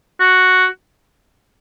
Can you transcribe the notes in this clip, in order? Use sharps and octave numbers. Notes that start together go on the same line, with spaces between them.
F#4